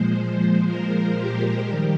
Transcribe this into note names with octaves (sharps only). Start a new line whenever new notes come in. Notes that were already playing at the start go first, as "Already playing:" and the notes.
Already playing: A#2 F3 G#3 C5
A#4
G4
D#3 G3